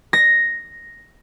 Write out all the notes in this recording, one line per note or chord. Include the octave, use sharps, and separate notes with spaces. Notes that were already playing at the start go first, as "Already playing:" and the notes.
A#6